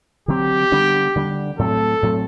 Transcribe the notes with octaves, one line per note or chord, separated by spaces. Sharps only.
D3 F#3 C4 G4
D3 G3 B3 D4
D3 G3 B3 D4
A2 F#3 A3 C4 A4
A2 F#3 A3 C4